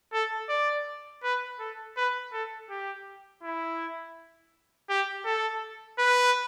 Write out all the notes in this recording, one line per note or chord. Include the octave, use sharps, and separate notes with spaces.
A4
D5
B4
A4
B4
A4
G4
E4
G4
A4
B4